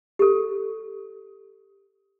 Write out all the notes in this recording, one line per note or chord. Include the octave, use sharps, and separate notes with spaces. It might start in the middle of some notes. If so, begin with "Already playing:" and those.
G4 A4